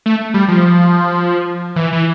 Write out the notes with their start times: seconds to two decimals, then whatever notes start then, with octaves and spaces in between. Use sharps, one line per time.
0.06 A3
0.34 G3
0.48 F3
1.76 E3
1.93 E3